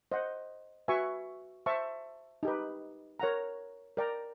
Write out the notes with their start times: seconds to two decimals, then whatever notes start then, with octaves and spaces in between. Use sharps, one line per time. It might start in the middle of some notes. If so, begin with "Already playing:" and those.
0.12 C5 D#5 F#5
0.88 F#4 B4 E5 G#5 C#6
1.66 C5 E5 A5 C#6
2.43 D#4 G4 B4
3.20 A#4 C#5 F#5 A#5
3.97 A#4 D5 G5 A#5